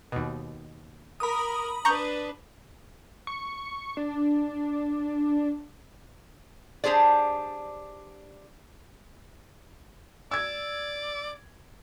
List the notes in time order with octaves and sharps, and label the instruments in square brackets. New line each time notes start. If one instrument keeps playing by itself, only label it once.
[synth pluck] D#2 B2
[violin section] A#4 [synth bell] B5 D#6
[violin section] D4 B4 [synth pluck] A#5 C#6 G6
[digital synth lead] C#6
D4
[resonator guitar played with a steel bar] D4 G4 G#4 C5 D5
[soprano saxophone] D5 [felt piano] E6 G#6